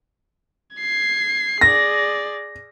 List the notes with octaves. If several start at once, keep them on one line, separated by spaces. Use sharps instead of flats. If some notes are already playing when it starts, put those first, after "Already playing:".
G#6 C7
G#4 D5 A#6